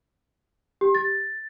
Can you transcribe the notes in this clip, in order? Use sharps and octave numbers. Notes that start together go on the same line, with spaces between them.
G4
A6